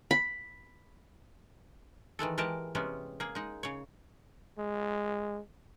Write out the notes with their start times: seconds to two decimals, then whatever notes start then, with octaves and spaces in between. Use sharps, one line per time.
0.11 B5
2.19 D#3 E3 G#3 A4
2.38 E3 G#3 G4 A#4 A5
2.75 C3 G3 G#3 B3 C#4
3.20 A#3 G#4
3.35 G#3 D#4
3.63 C#3 C#5
4.58 G#3